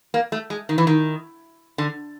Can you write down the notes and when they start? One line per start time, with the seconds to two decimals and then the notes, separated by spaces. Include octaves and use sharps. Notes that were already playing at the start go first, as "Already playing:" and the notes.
0.14 A#3
0.32 A3
0.50 G#3
0.69 D#3
0.78 E3
0.87 D#3
1.78 D3